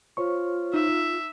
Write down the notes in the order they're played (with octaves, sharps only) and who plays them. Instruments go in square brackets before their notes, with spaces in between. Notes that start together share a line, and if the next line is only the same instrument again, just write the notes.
[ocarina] F4 [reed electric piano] C5 C#5 C#6
[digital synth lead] D#4 [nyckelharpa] E5